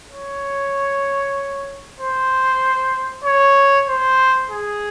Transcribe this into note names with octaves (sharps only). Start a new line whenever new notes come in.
C#5
C5
C#5
C5
G#4